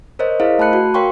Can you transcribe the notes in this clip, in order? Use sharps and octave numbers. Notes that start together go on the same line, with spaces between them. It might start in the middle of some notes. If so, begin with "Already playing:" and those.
A#4 C5 C#5 D#5
E4 G#4 A#4 C5 D#5 F5
A3 A5 B5 F#6 C#7
F#4
A#4 C#5 F5 G5 C6 C#6